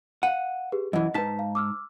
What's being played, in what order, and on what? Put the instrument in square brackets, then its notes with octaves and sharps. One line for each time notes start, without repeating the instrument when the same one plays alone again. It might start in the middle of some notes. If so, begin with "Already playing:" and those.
[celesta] F5 D#7 [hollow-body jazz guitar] F#5
[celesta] G4 G#4 B4
[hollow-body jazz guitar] F#2 E3 [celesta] D#5 F#5
[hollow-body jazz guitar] G#2 D#4 A5 [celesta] B4 B6
[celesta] F5
D6 E6 F6